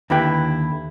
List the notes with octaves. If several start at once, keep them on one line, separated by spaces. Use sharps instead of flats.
D#2 D3 E4 G4 B4 G5